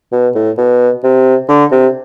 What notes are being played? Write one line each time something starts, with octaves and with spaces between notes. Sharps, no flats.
B2
A2
B2
C3
D3
C3